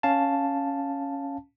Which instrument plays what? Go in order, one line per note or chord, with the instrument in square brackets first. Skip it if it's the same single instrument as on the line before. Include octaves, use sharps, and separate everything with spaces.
[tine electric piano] C#4 F5 A5